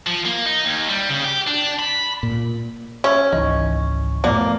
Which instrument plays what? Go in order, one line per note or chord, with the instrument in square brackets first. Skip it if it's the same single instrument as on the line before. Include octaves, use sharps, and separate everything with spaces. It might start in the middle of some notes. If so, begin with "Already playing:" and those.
[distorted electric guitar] F3
A#3
D#4
D#2
G3
C#3
G4
D4
B5
[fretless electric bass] A#2
[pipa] C#4 [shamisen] E5
[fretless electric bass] G#1 C#2 E3 [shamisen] D#4
[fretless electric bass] F2 A2 [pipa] A#3 [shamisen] B3 D5